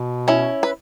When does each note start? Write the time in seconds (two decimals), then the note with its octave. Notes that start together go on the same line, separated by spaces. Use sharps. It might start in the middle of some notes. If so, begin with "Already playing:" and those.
Already playing: B2
0.28 C#4 E4
0.63 B4